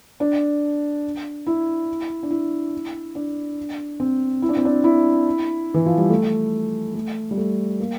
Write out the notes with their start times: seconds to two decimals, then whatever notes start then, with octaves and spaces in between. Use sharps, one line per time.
0.20 D4
1.47 E4
2.23 D4
2.31 E4
3.15 D4
4.00 C4
4.42 E4
4.49 D4
4.57 C4
4.65 D4
4.84 E4
5.74 E3
5.86 F3
5.98 G3
6.10 A3
6.95 A3
7.31 G3
7.37 A3
7.80 A#3